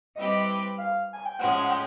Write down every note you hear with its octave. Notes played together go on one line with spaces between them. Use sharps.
G3 C4 E4 G4 B4 D#5
F5
G#5
G5
A2 F3 G#3 C#4 F#5
F#5
G5